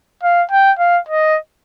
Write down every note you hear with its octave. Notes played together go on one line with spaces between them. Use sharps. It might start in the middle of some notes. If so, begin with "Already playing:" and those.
F5
G5
F5
D#5